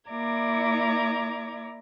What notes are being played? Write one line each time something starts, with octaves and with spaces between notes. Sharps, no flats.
A#3 E4 D5 A#5 D6 G#6